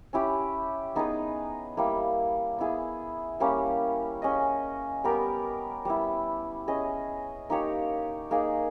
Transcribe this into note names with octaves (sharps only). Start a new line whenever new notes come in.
C#4 E4 G4
B3 D#4 G#4 B4
G3 A#3 E4
B3 E4 G#4
G3 A#3 C#4 G4
C#4 G#4 D#5
G3 B3 G4 A#4
G3 B3 E4
C#4 G#4 D#5
A#3 D#4 G4 C#5
A#3 D#4 G#4